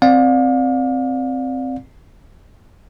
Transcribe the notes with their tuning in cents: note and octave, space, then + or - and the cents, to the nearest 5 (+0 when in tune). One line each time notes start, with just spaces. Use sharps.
C4 +0 D5 +0 F5 +35